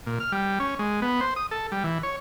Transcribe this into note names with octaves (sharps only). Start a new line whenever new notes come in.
A#2
F6
G3
C#4
G#3
B3
C5
D#6
A4
G3
E3
C#5